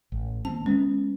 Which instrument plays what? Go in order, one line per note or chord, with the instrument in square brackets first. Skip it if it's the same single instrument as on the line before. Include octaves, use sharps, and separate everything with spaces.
[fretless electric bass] A1
[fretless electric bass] D#3 A#3 C4 [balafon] A5
[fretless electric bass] G#3 B3 [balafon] C#4